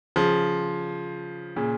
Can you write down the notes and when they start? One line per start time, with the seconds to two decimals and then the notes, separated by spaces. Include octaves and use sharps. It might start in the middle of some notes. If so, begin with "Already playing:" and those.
0.16 C#3 F3
1.56 A#2 C#3